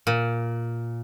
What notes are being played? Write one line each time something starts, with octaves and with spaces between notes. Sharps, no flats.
A#2